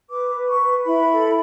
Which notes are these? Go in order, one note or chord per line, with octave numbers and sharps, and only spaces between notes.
B4 D6
B4
C#6
B4
E4 B5
A4